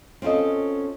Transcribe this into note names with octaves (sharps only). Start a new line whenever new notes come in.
C4 C#4 F4 A4 D#5